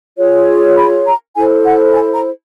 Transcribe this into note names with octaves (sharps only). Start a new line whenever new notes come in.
F4 G#4 C#5
B5
A#5
E4 A4 C5 G#5
F#5
G#5
A#5